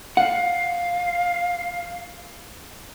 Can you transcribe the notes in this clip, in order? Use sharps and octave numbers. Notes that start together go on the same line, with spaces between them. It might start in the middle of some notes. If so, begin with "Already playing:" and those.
F5 F#5